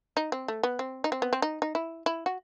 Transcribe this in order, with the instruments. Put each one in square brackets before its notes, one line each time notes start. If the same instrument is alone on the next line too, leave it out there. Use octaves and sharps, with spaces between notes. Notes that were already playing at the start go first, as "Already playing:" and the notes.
[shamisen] D#4
C4
A3
B3
C4
D#4
C4
B3
C4
D#4
D#4
E4
E4
F#4